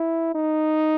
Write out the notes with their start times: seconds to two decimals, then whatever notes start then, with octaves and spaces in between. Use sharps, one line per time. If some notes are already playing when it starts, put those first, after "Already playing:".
Already playing: E4
0.35 D#4